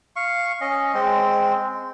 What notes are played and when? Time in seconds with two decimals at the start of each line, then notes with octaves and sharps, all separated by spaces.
0.16 F5 C#6
0.61 C#4 D#5
0.94 G#3 C4